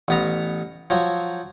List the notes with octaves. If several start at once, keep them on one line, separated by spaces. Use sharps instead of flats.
A1 B3 A#5
F3 F#3